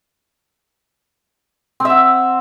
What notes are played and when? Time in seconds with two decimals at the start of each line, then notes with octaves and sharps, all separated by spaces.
1.80 C4
1.85 E5
1.90 F#5